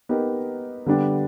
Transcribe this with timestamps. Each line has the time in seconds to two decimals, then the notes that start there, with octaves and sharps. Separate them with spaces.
0.09 B3 D#4 G4 A#4
0.86 D3 G3 B3 D4 G4